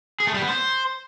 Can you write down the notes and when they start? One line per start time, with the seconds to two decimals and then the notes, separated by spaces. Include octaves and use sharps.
0.20 G#4
0.27 A3
0.34 G3
0.41 B3
0.49 C5